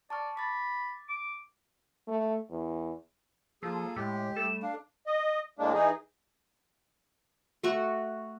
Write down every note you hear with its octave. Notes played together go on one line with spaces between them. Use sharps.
D5 A5 C#6 F6
B5 D6 A6
D6
A3
E2
F3 A#3 F4 G#4 A4
A2 G#3 G4
G3 A3 A4 E7
D4 F5
D#5
A2 G#3 A#3 D4
E3 D#4 G#4
A3 F#4 C#6